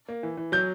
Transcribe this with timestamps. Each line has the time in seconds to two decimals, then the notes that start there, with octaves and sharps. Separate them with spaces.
0.09 A#3
0.23 E3
0.37 E3
0.52 F#3 G6